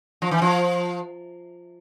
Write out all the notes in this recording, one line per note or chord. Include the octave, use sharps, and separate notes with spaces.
F3
E3
F3